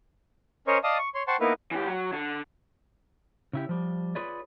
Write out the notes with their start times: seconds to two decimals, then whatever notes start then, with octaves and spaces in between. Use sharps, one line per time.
0.67 C#4 A#4 C5 C#5 D#5 C#6
0.84 D5 D#5 F5 A5 D#6
0.99 C#6
1.15 C#5 C6
1.27 C5 F#5 G5 A5 C6 C#6
1.40 A#3 B3 D#4 E4 A#4 B4
1.71 E3 G4
1.87 F#3
2.13 D3
3.53 C#3 E4 G4
3.69 F3 G3
4.15 F4 G#4 B4 C#5 D5